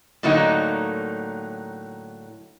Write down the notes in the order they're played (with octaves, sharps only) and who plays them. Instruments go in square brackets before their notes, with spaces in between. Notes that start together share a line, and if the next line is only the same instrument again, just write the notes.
[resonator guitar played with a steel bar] A2 D3 F#3 A#3 D#4